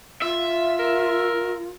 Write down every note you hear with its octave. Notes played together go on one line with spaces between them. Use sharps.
F4 E5
A#4